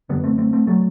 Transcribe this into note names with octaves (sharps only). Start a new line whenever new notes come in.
F#2 D3 G3 B3
A3 C4
A3 C4
A3 C4
F#3 A3